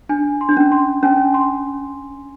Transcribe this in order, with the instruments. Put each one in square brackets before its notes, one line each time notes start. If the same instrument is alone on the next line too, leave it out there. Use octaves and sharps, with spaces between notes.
[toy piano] D4 [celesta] G#5
[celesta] C6
[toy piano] D4
C#4
[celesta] C6
[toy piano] C#4 [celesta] G#5
[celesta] C6